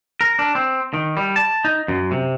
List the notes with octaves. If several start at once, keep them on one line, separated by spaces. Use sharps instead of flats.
A#4
D4
C4
D#3
G3
A5
D#4
F#2
C3